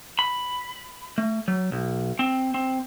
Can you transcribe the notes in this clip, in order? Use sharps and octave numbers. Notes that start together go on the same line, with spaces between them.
B5
A3
F#3
B1
C4
C4